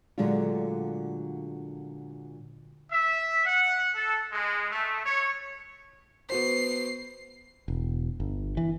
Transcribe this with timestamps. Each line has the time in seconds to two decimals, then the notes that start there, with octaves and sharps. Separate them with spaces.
0.18 A#2 D3 F#3 G#3 A3 F4
2.90 E5
3.44 F#5
3.95 A4
4.32 G#3
4.71 A3
5.05 C#5
6.30 B3 F#4 C5 C7
7.68 E1
8.20 G1
8.57 E3